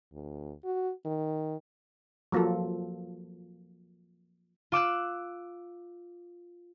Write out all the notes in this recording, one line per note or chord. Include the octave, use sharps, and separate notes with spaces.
D2
F#4
D#3
F3 F#3 A#3 F4 A4
F4 D6 E6 F#6